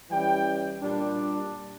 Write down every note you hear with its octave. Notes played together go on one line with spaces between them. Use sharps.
E3 G3 C#4 G5
A#2 G3 D4